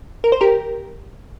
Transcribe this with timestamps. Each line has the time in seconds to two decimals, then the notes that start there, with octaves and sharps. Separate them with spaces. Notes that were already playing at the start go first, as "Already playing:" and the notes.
0.24 A#4
0.32 C5
0.41 G4 A#4